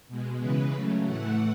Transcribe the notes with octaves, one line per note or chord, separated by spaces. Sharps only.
B2 G#3
C#3 E3 G#3 B4
C#3 F#3 A3
A2 E3 A3 F#5